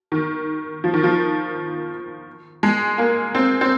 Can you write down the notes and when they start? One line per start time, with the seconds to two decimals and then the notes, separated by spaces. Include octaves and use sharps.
0.12 D#3
0.84 F3
0.94 D#3
1.03 F3
2.63 G#3
2.98 A#3
3.35 C4
3.61 C4